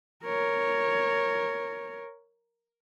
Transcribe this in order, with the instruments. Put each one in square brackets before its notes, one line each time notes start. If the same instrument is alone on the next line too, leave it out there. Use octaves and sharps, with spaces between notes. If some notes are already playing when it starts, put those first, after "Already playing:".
[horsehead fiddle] A#4 C#5